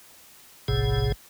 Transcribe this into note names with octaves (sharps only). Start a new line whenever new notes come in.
F#1 B1 A2 C3 G#4